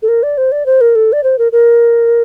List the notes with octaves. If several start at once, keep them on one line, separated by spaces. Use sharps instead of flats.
A4
A#4
D5
C5
D5
C5
A#4
A4
D5
C5
A#4
A#4